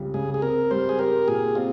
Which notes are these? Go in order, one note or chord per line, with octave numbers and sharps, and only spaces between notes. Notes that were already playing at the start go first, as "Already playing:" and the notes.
Already playing: C#2 C#3 G3 C4
C#3 G#4
G#4
C4 A#4
G3 C5
G#4
G4 A#4
A#2 G#4
C4 F4